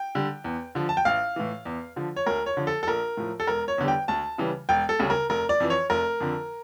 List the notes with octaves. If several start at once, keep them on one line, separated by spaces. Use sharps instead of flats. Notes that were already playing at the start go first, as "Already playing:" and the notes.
Already playing: G5
D3 G3
E2
D3 F3
A5
G5
A1 F5
A2 E3
E2
D3 F3
C#5
D2 A#4
C#5
D3 F3
A4
A4
A#1 A#4
A2 F3
A4
E1 A#4
C#5
E2 D3 G3
G5
D2 A5
C#3 E3 G3
E1 G5
A4
D2 C#3 G3
A#4
F1 A#4
D5
F2 E3
C#5
F1 A#4
F2 D3